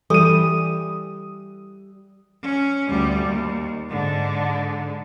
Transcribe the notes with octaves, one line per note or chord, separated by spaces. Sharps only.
E3 G3 A4 D#6 D#7
C#4
D2 G3
D#2
G#2 D3